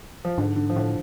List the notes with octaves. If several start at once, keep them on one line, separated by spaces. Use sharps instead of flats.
F3
G#2 D3
D3
F3
A2 D3